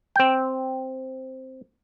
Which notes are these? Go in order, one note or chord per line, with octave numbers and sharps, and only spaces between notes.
C4 G5